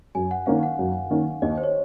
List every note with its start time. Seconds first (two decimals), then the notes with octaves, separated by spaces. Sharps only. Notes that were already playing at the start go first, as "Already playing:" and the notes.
0.15 F#2 G#5
0.31 F#5
0.46 D#3 A#3 C#4 F5
0.63 F#5
0.79 F#2
1.10 D#3 A#3 C#4
1.42 D#2 D#5
1.58 C5
1.63 C#5